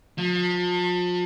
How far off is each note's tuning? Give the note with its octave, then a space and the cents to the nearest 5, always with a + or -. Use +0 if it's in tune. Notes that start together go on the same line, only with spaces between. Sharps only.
F3 +35